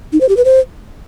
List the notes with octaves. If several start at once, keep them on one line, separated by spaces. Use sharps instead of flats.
D#4
C5
G4
B4
C5